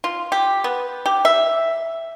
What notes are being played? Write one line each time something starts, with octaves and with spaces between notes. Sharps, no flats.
F4
G4
B3
G4
E5